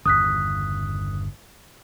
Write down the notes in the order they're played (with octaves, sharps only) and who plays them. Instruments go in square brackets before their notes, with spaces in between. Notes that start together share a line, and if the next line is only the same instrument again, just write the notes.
[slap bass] G1 E2 C#3 [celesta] D#6 F#6 B6